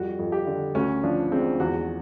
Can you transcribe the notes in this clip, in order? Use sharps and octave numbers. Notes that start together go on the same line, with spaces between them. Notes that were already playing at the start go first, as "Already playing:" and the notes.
Already playing: F2 G3 F#4
F2
G4
D3
D2 C#4
F3 D4
G#3 C4
E2 F#4